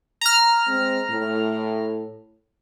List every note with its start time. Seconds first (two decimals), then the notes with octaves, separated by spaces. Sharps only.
0.21 A#5 F6
0.67 G#3 C4
1.10 A2